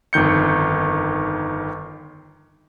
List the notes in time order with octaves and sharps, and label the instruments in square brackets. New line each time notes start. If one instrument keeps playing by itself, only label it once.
[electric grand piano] G1 F2 D#3 G6 C#7